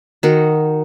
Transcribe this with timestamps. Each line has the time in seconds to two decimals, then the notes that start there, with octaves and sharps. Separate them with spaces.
0.23 D#3 D#4 F#4